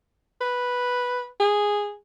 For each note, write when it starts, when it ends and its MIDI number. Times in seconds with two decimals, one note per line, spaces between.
0.41 1.26 71
1.40 1.94 68